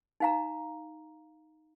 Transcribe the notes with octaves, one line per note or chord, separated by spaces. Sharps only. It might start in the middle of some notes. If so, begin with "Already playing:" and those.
D#4 F5 A#5